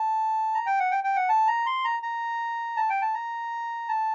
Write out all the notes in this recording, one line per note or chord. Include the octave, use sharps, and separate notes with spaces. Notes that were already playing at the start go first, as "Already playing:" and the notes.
Already playing: A5
A#5
G5
F#5
G5
G5
F#5
A5
A#5
C6
A#5
A#5
A5
G5
A5
A#5
A5